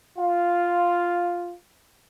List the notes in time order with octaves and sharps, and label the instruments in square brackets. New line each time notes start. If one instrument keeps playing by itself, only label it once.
[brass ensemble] F4 F5